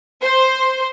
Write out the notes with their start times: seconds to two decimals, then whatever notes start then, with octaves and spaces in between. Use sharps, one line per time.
0.22 C5